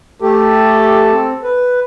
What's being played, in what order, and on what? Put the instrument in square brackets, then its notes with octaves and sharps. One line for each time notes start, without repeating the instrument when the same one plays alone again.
[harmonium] A3 G4 [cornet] A4
[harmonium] C4
B4